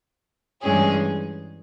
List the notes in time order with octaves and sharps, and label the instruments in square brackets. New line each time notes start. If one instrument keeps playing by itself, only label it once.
[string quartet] G2 E3 G#3 C#4 G#4